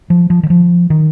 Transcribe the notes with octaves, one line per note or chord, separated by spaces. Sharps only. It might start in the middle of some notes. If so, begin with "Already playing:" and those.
F3
F3
D#3
F3
D#3